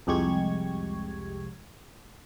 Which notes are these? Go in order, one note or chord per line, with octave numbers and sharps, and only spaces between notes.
C2 F2 G#3 G4 C#6 G#6